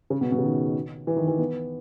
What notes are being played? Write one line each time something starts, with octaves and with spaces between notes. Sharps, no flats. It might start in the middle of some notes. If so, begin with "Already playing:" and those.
C#3
B2
B2
C#3
D#3
E3
D#3
E3
B3